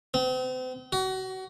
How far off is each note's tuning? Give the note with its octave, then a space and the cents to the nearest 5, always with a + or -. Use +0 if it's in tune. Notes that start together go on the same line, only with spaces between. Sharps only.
C4 -40
F#4 +30